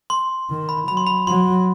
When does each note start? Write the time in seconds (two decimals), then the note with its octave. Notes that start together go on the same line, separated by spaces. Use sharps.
0.10 C6
0.50 D#3
0.69 B5
0.88 F#3 B5
0.97 C6
1.07 B5
1.27 F#3 C6